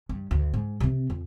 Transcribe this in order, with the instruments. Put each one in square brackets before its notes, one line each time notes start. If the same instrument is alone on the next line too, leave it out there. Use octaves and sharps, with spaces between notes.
[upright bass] G2
D2
G#2
C3 C4
F2